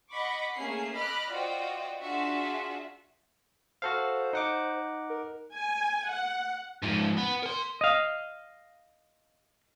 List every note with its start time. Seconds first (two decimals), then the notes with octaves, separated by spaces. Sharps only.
0.12 D#5 F#5 B5 C#6 D6
0.56 A3 A#3 C#4 G#4 C7
0.94 D#5 B5 D6 F6 F#6
1.30 F4 F#4 C5 D5 D#5 G5
2.01 D4 F4 F#4 G#4 E5
3.82 F#4 A4 C5 F5
4.33 D#4 F#5 D6
5.10 A#4
5.54 G#5
6.09 F#5
6.82 G#2 F3
7.17 B3
7.43 A#4 C6
7.81 D#5 F5